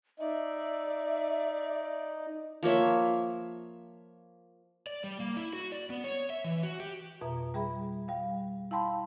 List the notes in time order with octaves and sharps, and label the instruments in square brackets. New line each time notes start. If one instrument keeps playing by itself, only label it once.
[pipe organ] D#4 [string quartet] D5 [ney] E5
[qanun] F3 A#3 C#5 E5
[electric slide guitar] D5
G3
A#3
E4
F#4
D5
B3
C#5
E5
E3
F#4
G4
[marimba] F2 B2 E5 A#5
G3 G#4 E5 B5
G3 F5
E4 F5 G5 A5 B5 C6